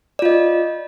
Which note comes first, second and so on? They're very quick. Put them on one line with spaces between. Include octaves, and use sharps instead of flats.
D5 F4 D#5